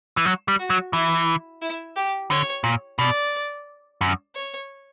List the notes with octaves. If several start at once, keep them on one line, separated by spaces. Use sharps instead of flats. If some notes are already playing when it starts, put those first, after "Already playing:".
E3
F#3
G3
F#4
F#3
E3 E4
E4
G4
D3 C#5
A#2
B2 D5
F#2
C#5